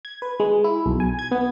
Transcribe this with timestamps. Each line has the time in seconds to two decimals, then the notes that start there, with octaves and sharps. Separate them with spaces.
0.05 G#6
0.22 B4
0.40 G#3
0.64 E4
0.86 B1
1.00 G#5
1.19 G#6
1.31 B3